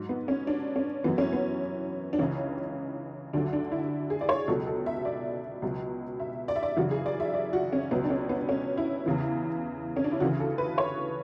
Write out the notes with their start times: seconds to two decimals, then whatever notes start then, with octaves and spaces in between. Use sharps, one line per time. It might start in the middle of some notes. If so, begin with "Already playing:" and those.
Already playing: G#2 F#3
0.09 B3
0.28 C#4
0.47 D4
0.76 C#4
1.04 F#2 E3 B3
1.18 C#4
1.32 B3
2.13 D4
2.18 C#2 C#3 E3 C#4
3.33 D2 D3 F#3 D4
3.53 D4
3.72 E4
4.10 G#4
4.21 D5
4.29 C#5
4.48 C#2 B2 F#3 A4
4.67 A4
4.86 E5
5.05 D5
5.62 C#2 B2 F#3
6.20 E5
6.48 D5
6.56 E5
6.63 D5
6.77 F#2 C#3 E3 F#4
6.91 G#4
7.06 D5
7.20 E5
7.34 D5
7.53 F#4
7.73 C#4
7.91 C#2 B2 F#3 B3
8.04 D4
8.10 C#4
8.29 B3
8.49 C#4
8.77 E4
9.06 E2 C#3 E3
9.97 C#4
10.04 D4
10.12 E4
10.20 D2 C#3 E3 F#4
10.40 A4
10.58 B4
10.78 C#5